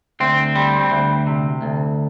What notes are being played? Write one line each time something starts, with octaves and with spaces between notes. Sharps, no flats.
D2 C4
G3
D2
C3
D2